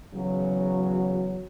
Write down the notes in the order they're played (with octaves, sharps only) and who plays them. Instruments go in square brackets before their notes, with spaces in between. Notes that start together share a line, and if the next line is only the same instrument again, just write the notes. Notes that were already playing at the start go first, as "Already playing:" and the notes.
[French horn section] E2 C#3 F#3